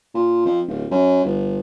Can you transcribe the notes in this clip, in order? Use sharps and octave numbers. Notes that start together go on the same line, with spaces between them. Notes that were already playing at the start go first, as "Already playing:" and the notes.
A#2
F2
D1
F#2
G1